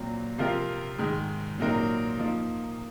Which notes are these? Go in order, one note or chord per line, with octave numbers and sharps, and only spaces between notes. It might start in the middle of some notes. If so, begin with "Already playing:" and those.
Already playing: A#2 F#3 C4
C3 F3 C4 F4 A#4
G#2 D#3 G#3
A#2 F#3 C4 D#4 A#4
F3 A#3 D#4